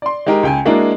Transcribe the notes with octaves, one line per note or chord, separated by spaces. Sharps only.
D5 C6
G#3 D#4 G4 A#4
C#2 G5 G#5
G#3 A#3 D4 E4 F#4 A#4